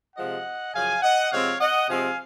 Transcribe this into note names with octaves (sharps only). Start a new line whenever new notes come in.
C3 F3 G#3 D#5 F#5
F#2 C#3 F3 F5 G#5
D#5 F#5
C3 F3 G#3 C4 C#5 F5
D#5 F#5
C3 F3 G#3 C4 F5 G#5